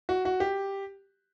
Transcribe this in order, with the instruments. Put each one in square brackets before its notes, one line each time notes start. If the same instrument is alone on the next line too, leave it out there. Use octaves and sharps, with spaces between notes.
[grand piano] F#4
F#4
G4